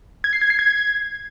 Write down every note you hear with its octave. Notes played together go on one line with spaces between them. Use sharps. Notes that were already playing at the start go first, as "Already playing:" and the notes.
G#6
C7
G#6
C7
G#6